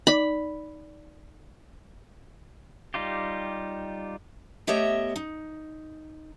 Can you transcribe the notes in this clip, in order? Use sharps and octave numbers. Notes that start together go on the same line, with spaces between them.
D#4 D5 B5
G3 D#4 F4 G4
A3 B3 G4 C#5 D#5 E5
D#4